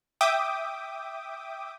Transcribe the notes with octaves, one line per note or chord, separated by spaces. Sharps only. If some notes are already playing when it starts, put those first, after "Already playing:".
E5 G5 D6 D#6